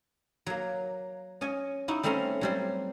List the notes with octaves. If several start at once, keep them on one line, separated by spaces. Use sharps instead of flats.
F#3 A#3
C#4 D#5 G#5
D#4 E4 F#4
G3 A3 C4 C#4 A#5
F#3 G3 C4